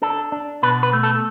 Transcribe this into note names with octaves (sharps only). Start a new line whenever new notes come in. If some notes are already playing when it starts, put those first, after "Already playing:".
D4 A4
D4
B2 B4
B4
A3
A4